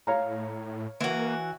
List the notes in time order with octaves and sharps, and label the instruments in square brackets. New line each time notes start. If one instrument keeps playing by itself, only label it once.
[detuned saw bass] A2 [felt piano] C#5 F5 A#5
[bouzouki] E3 F#4 [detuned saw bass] A#3